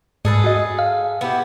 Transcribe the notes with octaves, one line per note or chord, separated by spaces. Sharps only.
G#2 G#4 A4 B4
F#4 D#5
F5
B3 E4 G4